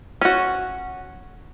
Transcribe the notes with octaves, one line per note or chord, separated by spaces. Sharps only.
C#4 F#4